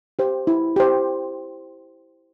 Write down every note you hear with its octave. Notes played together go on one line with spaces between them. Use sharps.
G4 C5
E4
G4 C5